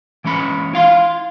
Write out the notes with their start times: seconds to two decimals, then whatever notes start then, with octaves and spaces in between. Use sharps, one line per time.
0.24 E3 G#3 C#4 B5
0.73 E4 F5 C6